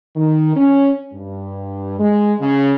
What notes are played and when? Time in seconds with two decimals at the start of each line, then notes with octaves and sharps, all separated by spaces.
0.16 D#3
0.55 C#4
1.13 G2
1.98 G#3
2.39 C#3